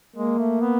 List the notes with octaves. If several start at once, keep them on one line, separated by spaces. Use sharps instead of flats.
G#3 A#3
A3
B3